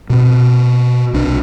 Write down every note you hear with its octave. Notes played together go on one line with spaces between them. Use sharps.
B2 C4
C2 D4